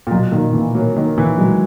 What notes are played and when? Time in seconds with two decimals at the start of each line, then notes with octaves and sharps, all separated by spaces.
0.07 A#2
0.10 B2 F#3
0.32 A#2 D#3
0.53 A#2 E3
0.75 F#3 A#3
0.96 D#3 A#3
1.17 A#2 E3
1.38 F#3 G#3